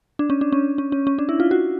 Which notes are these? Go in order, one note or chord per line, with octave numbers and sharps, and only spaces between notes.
D4
C#4
D4
C#4
C#4
C#4
C#4
D4
E4
F4
F#4